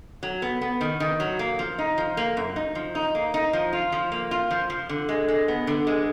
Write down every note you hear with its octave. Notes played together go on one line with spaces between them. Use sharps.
F#3
B3
B3
D#3
D#3
F#3
A#3
F3
D#4
F3
A#3
F#2
D#4
F3
D#4
A#3
D#4
F3
F4
F3
A#3
F4
F3
F3
D3
G#3
G#3
B3
D3
G#3